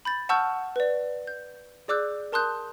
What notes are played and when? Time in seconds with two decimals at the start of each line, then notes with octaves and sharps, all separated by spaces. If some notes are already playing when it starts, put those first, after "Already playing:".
0.05 B5 G6 A6
0.29 F#5 A5 C#6 E6 F6 G6
0.76 B4 D5
1.27 G6
1.88 G#4 D5 D6 E6 F#6 G6
2.32 A#4 A5 C6 D#6 F#6 G6